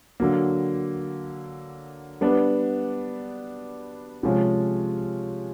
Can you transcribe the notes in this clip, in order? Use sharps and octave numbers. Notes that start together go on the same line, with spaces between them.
D3 F#3 A#3
G3 B3 D4
C3 F3 G#3 C#4 F4